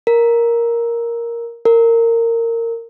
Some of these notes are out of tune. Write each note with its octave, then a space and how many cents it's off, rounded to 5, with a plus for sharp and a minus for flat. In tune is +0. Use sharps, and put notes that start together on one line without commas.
A#4 +5
A#4 -20